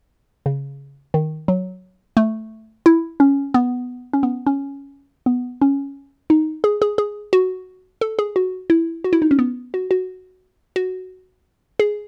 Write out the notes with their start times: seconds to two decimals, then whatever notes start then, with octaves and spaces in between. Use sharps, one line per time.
0.46 C#3
1.14 D#3
1.48 F#3
2.17 A3
2.86 E4
3.20 C#4
3.54 B3
4.13 C#4
4.23 B3
4.46 C#4
5.26 B3
5.61 C#4
6.30 D#4
6.64 G#4
6.82 G#4
6.98 G#4
7.33 F#4
8.01 A4
8.19 G#4
8.36 F#4
8.70 E4
9.04 F#4
9.13 E4
9.22 D#4
9.31 C#4
9.39 B3
9.74 F#4
9.91 F#4
10.76 F#4
11.80 G#4